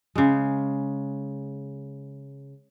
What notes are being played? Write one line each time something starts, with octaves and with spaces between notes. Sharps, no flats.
C#3 G#3